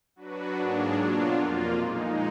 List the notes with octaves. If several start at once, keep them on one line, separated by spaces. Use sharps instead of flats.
F#3 D4 F#4 B4
G#2 F#3 A#3 D4 G#4
B2 F#3 D4 F4
F2 F3 A#3 F4
A#2 G#3 D#4